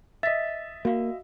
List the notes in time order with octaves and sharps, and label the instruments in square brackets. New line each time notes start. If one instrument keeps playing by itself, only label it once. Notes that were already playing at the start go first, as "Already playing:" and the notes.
[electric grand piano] D#5 E5 [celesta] A6 B6
[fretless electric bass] A#3 [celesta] F#4 F5